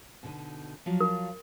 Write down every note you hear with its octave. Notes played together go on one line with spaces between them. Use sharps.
B2 D3 D#4
F3 F#3 F4
A#4